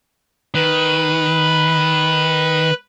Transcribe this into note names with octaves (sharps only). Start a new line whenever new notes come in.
D#3 B4 B5